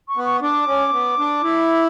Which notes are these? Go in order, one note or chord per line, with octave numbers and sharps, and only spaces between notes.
C#6
B3
C#6
D4 D6
C#4
B3
D4
E4